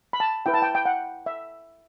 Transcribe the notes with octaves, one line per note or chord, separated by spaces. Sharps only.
B5
A5
E4 B4 G5
A5
G5
G5
F#5
E5